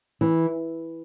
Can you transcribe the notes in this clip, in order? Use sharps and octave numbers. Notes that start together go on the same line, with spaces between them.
E3